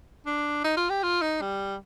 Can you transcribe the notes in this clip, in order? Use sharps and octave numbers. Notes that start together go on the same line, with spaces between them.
D4
D#4
F4
G4
F4
D#4
G3